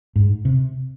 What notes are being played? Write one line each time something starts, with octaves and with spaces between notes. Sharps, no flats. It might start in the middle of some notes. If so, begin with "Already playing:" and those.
G#2
C3